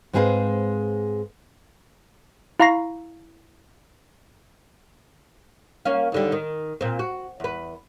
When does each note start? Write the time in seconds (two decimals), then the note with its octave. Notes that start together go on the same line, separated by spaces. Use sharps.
0.13 G#2 G#3 C4 G#4 B4 F5
2.60 E4 F5 A#5 C#6 A#6 C7
5.85 A#3 C#4 F5
6.12 D#2 D3 G3
6.32 D#3
6.81 A#2 C4
6.99 F#4
7.40 E2 B4